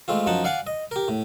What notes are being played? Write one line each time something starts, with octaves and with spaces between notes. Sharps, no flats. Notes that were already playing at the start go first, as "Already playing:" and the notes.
G#3 A3 C4 F4
F#2 F3 D#4 F#5 A5
D5 F5 F#5 G#5 D6
D#5
G4 A#4
A2